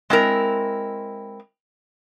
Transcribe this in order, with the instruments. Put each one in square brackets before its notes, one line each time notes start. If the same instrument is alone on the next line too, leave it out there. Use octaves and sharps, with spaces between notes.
[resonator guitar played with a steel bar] G#3 C4 E4 A#4